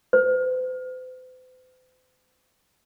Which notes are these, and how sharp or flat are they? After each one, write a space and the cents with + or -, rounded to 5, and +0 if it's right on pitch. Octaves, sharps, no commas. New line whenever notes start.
C5 -45